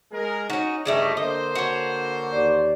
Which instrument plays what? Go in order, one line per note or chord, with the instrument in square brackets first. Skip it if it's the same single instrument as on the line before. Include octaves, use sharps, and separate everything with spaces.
[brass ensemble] G#3 G#4 A#4
[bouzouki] C#4 F#4 [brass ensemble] D#4
[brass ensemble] G1 D#5 [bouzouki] C#3 G3 A3
[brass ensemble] D3 A#3 C5 [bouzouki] D#5
[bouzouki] F#4 C#5
[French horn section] D#2 D5